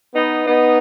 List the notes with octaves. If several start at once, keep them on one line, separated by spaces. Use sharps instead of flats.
B3 D#4
B3 D#4